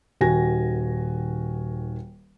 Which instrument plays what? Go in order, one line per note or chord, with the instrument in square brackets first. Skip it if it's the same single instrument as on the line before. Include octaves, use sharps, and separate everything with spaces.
[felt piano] D#1 D#3 F#4 G#5 A#6